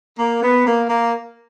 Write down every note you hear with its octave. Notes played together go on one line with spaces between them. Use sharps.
A#3
B3
A#3
A#3